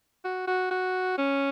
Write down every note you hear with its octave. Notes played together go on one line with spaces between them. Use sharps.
F#4
F#4
F#4
C#4